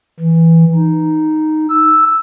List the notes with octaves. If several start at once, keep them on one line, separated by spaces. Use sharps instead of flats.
E3
D#4
E6